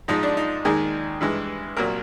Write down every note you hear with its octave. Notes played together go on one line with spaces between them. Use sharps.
G#2 F3 G#3 D#4
D4
D#4
D#2 D#3 G#3 G#4
G2 E3 G#3
C2 A#2 F#3 A#4